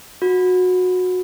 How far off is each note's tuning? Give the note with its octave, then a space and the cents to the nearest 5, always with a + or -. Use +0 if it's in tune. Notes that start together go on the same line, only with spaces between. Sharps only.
F#4 -20